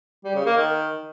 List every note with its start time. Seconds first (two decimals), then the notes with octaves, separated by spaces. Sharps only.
0.25 G3
0.35 C#3
0.46 A#3
0.56 D#3